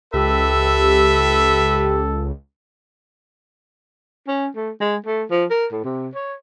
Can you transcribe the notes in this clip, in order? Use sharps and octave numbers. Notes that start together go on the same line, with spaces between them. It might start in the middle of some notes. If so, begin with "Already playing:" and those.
C#2 G4 A4 B4 E5
C#4
A3
G#3
A3
F3
A#4
A2
C3
C#5